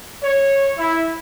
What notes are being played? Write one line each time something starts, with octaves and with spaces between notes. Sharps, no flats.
C#5
E4